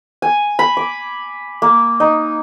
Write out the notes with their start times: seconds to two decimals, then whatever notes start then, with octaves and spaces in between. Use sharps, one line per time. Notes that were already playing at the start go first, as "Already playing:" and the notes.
0.22 G#5
0.59 B5
0.77 D6
1.62 A#3
2.00 D#4